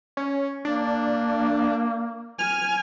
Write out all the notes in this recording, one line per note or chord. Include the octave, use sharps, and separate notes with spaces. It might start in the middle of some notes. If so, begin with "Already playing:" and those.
C#4
A#3 D4
G#5 F6